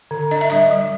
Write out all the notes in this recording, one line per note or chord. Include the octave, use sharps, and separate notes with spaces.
D3
D4 D#5
E5
G3 D#5
G3